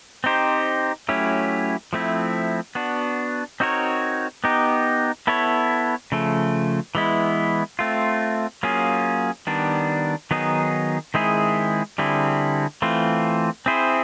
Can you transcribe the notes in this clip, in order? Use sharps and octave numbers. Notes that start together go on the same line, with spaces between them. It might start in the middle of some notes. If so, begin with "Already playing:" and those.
C4 D#4 G4 C5
F#3 A3 C#4 E4 G4
F3 A3 C4 E4
B3 D4 F#4
C4 D#4 F#4 A#4 C#5
B3 D#4 G4
B3 E4 A4 C#5
C#3 F3 A3
E3 G#3 B3 E4
A3 C4 F4
F#3 A#3 C#4 F4 G#4
D#3 G3 B3 D4
D#3 F#3 B3 D#4 G#4
D#3 G#3 C4 E4 G#4
D3 G3 C4 E4 G#4
E3 A3 C4 F4
C4 E4 G#4 C5